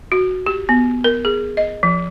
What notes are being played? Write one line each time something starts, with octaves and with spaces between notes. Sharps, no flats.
F#4
G4
B3
A#4
G#4
D#5
F3